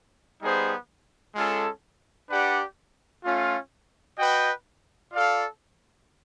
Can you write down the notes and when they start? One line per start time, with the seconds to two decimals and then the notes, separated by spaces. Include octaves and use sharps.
0.42 G3 B3 D#4 G#4 C5
1.35 G#3 C#4 F4 A4
2.29 D4 G4 B4 D5 F#5
3.23 A3 C#4 F4
4.18 F#4 B4 D#5 G5
5.12 F4 A4 D5 F5